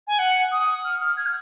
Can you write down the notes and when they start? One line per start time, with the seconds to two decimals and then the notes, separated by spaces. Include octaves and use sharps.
0.07 G#5
0.19 F#5
0.51 D#6
0.84 F6
1.00 F6
1.17 G#6
1.26 F6